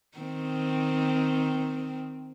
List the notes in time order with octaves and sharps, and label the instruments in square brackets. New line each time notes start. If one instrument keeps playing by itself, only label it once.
[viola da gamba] D#3 C4